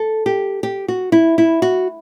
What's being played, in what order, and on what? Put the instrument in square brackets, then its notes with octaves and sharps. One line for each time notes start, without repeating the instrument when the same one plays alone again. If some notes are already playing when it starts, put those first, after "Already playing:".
Already playing: [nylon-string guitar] A4
G4
G4
F#4
E4
E4
F#4